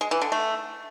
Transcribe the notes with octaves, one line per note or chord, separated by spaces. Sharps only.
G#3
E3
D3
A3